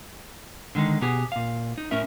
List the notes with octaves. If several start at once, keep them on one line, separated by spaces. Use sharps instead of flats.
D3 D#3 G#3 D#4
B2 B3 G4 G#4
A#2 F5
D#4
A2 C#4 A#4 E5